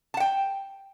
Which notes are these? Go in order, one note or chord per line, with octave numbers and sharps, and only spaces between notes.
F#5 G5 A5